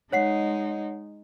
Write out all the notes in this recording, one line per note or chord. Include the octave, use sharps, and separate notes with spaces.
G#3 D#4 C#5 F#5 C7